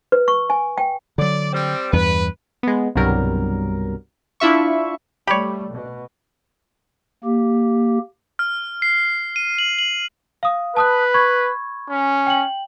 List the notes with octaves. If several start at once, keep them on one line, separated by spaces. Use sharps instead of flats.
B4
C#6
G#5
G5
D3 F#3 D5
G3 C4
E2 G2 B4
G#3 B3
C2 G2 B2 F#3 G3 A#4
D4 E4 F4 E5 C#6
G3 A3 G4 C#5 D5 B5
B2
A#3 G4
F6
C7
D#7
F#7
F#7
F5 D#6
B4 A5 D#6 F#6
B5 C#6 G#6
C#4
G5 F#7